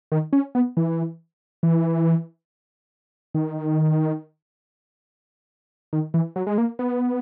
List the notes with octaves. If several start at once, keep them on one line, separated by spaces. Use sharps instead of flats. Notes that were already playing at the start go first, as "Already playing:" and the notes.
D#3
C#4
B3
E3
E3
D#3
D#3
E3
F#3
G#3
A#3
B3